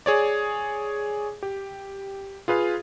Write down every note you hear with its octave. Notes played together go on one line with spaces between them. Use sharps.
G#4 C#5 D5
G4
F4 G#4 B4 F5